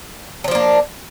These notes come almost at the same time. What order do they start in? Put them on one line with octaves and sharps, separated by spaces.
F#3 F3 D4 A#3